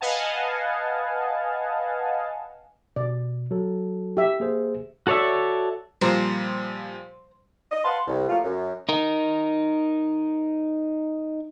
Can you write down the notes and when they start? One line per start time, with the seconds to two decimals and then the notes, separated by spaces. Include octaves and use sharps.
0.01 B4 D#5 F5 F#5 G#5 A5
2.96 B2 D5
3.51 F#3 A4
4.17 G4 E5
4.40 A#3 G#4 C5
5.07 F#4 A4 C#5 D5 E5
6.01 A#2 F3 G3 C5 A#5
7.72 D#5
7.84 B4 F5 F#5 A5 C6
8.08 C2
8.29 F3 F#3 A3 A#3 F4
8.44 F#2
8.89 D#4 A#4